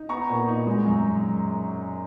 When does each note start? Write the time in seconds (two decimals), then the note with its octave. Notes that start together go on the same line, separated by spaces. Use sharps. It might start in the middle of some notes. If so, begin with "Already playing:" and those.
Already playing: D#4
0.09 B3 A#5 C#6
0.29 A#2
0.48 D#4
0.67 G#3
0.86 F#2